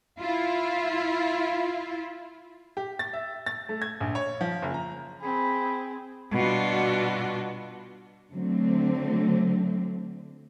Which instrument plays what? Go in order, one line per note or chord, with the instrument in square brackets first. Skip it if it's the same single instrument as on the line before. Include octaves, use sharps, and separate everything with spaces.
[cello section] E4 F4
[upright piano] G4
A6
E5
A6
A3
G#6
A#1
C#5
F3
F#1
A#5
[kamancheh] C4 G#4 [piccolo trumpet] B5
[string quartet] B2 G3 D4 F4 F#4
[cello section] D3 F#3 A3 C4